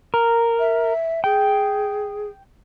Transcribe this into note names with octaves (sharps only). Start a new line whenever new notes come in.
A#4
E5
G#4 G5